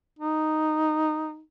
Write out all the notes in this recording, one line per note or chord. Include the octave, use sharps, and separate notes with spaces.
D#4